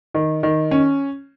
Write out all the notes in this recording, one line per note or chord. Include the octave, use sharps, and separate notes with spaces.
D#3
D#3
C#4